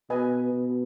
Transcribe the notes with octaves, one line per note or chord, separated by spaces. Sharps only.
B2 B4 D#5 G#5
B2